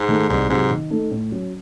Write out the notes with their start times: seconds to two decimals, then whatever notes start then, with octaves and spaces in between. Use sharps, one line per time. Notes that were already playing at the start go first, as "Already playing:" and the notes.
Already playing: G#2
0.09 D#3 A3
0.29 C2 G#2
0.49 G#2 C3 F#3
0.71 D#3
0.90 A3 D#4 A4
1.11 A2
1.32 F#3 C#4